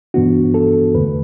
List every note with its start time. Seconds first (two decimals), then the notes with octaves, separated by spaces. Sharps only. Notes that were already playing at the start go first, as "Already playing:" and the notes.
0.14 G2 E3 B3 D4 F#4
0.54 A4
0.95 E2 D3 A3 B4